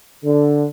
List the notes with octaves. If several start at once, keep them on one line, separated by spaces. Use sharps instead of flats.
D3